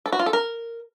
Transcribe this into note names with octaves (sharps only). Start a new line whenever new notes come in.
A4
F#4
F4
A4
A#4